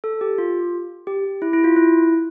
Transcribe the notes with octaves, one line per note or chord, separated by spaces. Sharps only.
A4
G4
F4
G4
E4
E4
F4
E4